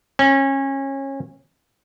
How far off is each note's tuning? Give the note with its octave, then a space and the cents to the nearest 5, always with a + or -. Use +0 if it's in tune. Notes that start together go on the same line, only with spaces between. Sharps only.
C#4 -25